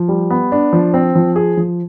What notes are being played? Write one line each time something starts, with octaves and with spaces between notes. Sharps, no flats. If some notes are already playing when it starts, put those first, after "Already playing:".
Already playing: F3
G3
B3
D4
F3
C4
F3
G#4
F3